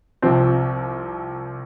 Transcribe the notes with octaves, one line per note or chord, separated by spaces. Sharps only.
C2 C3 F3 C4